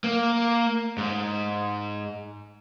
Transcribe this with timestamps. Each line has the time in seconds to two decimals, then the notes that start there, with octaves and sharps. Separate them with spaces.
0.04 A#3
0.98 G#2